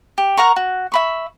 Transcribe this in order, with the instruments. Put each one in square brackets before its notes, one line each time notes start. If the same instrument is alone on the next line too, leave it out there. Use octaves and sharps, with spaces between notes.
[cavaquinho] G4
A#4 F#5 A#5 C#6
F#4
E5 B5 C#6